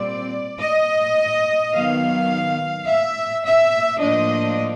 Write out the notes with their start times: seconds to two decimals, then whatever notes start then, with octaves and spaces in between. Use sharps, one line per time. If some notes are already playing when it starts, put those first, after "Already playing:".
Already playing: A#2 G3 C4 D5
0.60 D#5
1.73 D#3 F#3 B3 F5
2.87 E5
3.44 E5
4.00 A2 F3 A#3 D4 D#5